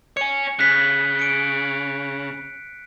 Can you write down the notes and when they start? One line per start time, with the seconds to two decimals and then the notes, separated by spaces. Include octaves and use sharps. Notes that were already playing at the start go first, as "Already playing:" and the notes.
0.17 C#5 G#5 C#7
0.59 C#3 F#6 B6
1.19 C#7 D7